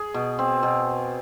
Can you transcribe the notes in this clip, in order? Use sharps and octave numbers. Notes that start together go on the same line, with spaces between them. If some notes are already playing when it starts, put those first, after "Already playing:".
Already playing: G#4
B2
C4
B2